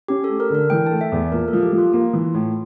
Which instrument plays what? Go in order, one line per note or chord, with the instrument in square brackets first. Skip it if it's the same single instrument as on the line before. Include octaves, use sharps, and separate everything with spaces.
[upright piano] C#4 [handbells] G4
[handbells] A4
[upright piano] A3
[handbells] A#4
[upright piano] D3 [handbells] A#4
[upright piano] E3 [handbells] G5
[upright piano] A3 [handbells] A5
[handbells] E5
[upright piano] E2
[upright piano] A#2 [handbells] A#4
[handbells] A4
[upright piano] F3
[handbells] G4
[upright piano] F3
[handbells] F4
[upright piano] A#3 [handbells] F4
[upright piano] E3
A2